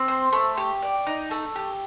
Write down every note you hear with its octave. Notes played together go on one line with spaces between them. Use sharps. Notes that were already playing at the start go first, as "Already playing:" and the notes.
Already playing: C4
C5
A3
G4
D5
D#4
A3
G4